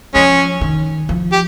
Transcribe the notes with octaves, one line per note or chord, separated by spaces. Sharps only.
F3 G#3 C#4
D#3
F3
G4